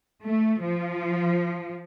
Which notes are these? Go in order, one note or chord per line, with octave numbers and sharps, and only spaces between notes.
A3
F3